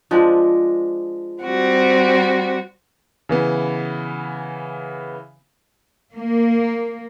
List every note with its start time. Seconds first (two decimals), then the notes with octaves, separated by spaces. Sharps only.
0.11 F3 G#3 D4
1.43 G3 C4 F#4
3.29 C#3 E3 B3
6.13 A#3